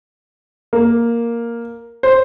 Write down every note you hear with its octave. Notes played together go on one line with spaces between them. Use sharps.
A#3
C5